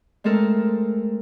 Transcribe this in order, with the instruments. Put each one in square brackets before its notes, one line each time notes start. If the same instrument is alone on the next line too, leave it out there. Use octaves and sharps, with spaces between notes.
[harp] G#3 A3 C4 A4 A#4